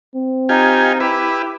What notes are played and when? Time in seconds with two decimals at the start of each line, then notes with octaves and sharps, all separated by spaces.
0.15 C4
0.49 D#4 F4 G4 G#5
1.00 E4 G4 B4